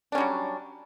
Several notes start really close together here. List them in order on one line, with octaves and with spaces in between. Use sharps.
D4 C#4 G3 F#3